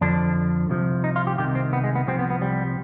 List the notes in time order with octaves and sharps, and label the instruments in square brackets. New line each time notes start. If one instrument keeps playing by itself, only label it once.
[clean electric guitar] F2 D3 F3 D4
C2 C3 F3
D#4
F4
G4
C2 C3 D#3 G4
C4
B3
G#3
B3
C2 C3 F3 C4
B3
B3
G3